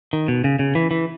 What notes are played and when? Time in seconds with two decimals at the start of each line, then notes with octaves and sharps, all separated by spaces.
0.13 D#3
0.28 B2
0.44 C#3
0.59 C#3
0.75 E3
0.91 E3